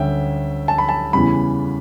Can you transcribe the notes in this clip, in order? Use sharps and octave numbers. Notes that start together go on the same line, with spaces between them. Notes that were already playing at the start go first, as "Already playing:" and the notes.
Already playing: D2 D3 G3 C#4 E5 G5
A5
B5
A5
E2 C#3 E3 G3 B5